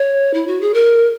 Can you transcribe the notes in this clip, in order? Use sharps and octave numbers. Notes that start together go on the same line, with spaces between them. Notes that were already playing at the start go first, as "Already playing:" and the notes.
Already playing: C#5
E4
F#4
G#4
A#4